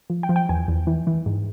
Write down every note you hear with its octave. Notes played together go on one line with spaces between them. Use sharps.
F3
G5
F3
G5
E2 G#5
E2
E3
E3
G#2